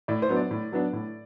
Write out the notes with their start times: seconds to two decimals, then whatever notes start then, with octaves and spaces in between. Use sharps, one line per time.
0.08 A2 D5
0.22 C5
0.29 F#3 B3 D4
0.36 D5
0.51 A2
0.72 F#3 B3 D4
0.93 A2